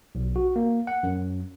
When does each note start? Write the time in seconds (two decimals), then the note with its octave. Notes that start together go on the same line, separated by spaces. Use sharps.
0.15 B1
0.36 F#4
0.56 A#3
0.87 F#5
1.03 F#2